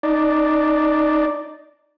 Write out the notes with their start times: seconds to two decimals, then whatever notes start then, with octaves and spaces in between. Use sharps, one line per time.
0.03 D#4 D5